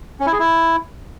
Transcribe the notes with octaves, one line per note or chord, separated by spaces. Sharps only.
C#4
E4
G#4
E4